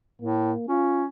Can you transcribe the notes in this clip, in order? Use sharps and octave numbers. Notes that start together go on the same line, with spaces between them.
A2 A#3
C#4 F4